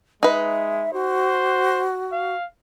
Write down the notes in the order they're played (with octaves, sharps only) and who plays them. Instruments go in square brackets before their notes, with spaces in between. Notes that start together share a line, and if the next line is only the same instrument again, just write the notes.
[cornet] G#3 [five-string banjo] D#4 B4 [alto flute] E5
[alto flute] F#4 [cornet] C5
[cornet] F5